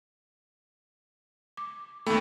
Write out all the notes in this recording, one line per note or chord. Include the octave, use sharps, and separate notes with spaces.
D6
D#2 A3 B3 G5 B5